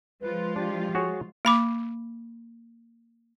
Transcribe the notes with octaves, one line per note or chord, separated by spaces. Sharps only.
F3 G#3 F4 B4
D4 G4
F#4 G#4 C#5
A#3 B5 D6